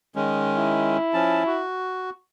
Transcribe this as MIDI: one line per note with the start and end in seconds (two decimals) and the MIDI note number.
0.16 0.97 51
0.16 0.97 56
0.16 0.97 61
0.57 1.62 64
1.14 1.43 53
1.14 1.43 61
1.14 1.43 81
1.47 2.10 66